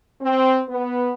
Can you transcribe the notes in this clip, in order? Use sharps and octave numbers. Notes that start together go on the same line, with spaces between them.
C4
B3